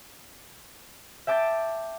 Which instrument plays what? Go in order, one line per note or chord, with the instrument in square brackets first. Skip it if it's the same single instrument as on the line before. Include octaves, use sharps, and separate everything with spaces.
[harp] E5 G5 A5 D6 G6 A6